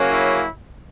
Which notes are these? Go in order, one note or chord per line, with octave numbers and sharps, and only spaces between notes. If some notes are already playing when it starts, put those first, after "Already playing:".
Already playing: C#3 F#3 A#3 C#4
E4